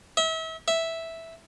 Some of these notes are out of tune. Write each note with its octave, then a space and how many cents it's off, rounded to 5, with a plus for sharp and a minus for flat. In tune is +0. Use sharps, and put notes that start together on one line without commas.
E5 -35
E5 -5